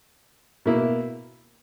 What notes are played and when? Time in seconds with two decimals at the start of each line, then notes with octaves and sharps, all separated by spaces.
0.66 B2 A#3 E4